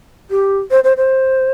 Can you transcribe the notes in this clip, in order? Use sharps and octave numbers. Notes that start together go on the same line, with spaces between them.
G4
C5
C5
C5